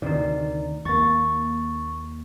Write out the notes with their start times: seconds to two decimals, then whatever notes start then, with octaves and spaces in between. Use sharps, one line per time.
0.02 D2 C3 D#3 D#4 D5
0.85 D#2 A#3 C#6 A6